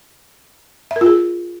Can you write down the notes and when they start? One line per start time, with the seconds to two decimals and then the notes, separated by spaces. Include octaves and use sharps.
0.91 E5
0.96 A#4
1.01 F4
1.06 G#4